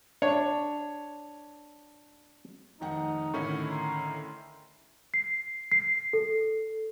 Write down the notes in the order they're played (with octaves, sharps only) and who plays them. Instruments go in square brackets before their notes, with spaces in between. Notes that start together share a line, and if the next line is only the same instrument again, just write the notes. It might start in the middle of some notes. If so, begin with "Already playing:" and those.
[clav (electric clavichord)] D4 [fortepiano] C#5
[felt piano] F1 D#3 F#5 [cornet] D#4
[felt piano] A2 D3 [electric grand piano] D#3 C#4 E4 [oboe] C#6
[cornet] A#5 [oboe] C6
[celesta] C7
C7
A4